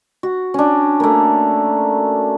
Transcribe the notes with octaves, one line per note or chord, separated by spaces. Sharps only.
F#4
C#4 D4
A3 A#3